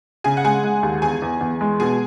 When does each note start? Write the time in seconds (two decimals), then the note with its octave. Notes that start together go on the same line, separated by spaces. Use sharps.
0.24 C#3 G#4 G#5
0.37 F#5
0.44 G#3 G#4 G#5
0.64 G#3
0.83 D#2
1.02 E2 G#4 G#5
1.22 E2
1.41 E2
1.61 G#3
1.80 B2 G#4 G#5